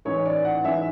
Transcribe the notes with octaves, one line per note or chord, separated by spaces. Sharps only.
A1 G#2 E3 C#5
D5
F#5
A1 G#2 E3 E5